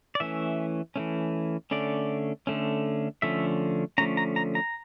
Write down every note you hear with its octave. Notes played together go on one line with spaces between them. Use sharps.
D5
E3 A3 C#4 E5
E3 A3 C#4
D3 A3 C#4 D5
D3 A3 C#4
D3 F3 A3 C#4 E5
D3 F3 A3 C#4 A#5
A#5
A#5
A#5